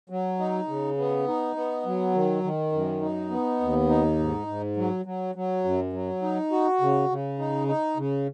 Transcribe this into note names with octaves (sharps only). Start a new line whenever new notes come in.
F#3
D#4
C#3
B3
D#4
B3
F#3
D#3
D#3
F#2
D#4
B3
D#2
D#4
G#2
G#2
F#3
F#3
F#3
F#2
F#3
D#4
F#4
C#3
C#3
D#4
D#4
C#3